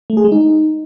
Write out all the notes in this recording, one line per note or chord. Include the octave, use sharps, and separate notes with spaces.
A3
G#4
G#3
D#4